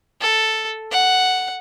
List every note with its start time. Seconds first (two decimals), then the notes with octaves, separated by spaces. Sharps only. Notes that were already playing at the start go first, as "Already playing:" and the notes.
0.21 A4
0.91 F#5